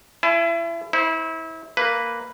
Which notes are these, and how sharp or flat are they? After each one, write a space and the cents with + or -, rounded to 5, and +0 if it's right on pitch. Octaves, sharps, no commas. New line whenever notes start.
E4 +30 C#5 -15 A5 -45
E4 -30 C5 +10
A#3 +0 B4 +0